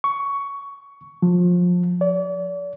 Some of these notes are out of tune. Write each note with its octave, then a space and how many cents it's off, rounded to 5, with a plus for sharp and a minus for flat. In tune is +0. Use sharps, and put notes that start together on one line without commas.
C#6 +15
F3 +25
D5 -35